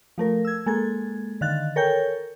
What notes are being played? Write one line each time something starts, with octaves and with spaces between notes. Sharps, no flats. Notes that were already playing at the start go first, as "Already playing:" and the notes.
F3 A3 A#4
E6 G#6
G#3 A#3 A4 G#6
D3 D#3 F5 F#6 A6
A4 A#4 C#5 G5 G#5 G6